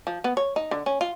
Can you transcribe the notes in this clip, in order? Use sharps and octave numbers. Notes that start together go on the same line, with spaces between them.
F3
B3
C#5
D#4
D3
C#4
F4